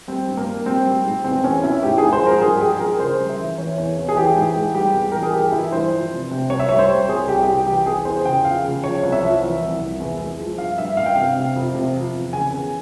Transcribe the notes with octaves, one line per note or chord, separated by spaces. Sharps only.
G3 C4
G2
A#3
G3
G3 C4
G3
G#2
E2 C4
E2 C#4
E2 E4
G#2 G4
G#2 G#4
C5
F3 A#4
G2 G#4
G4
G#3 G#4
F3 A#4
C#3 C5
G3
E5
E3
E3 C#5
E2
E2
G#4
E3 G4
G#2
G#3
G3 G4
E2
E3 A#4
G#4
G2 G4
E3 E4
G2 C5
F3
C3
C3
C2 C#5
E5
G3 C#5
C5
G3
C2 G#4
C2 G4
C2 G4
E3 G4
E3 G#4
E2 C5
C#3 G5
F3 F5
C#3
F3 C#5
C2
E5
F3
E3
C2
C2
E2
G#3
F3
G2 F5
G2 E5
G2 F5
G5
C3 F5
C3
F2
C3
F3
E2
C#3 G#5
E2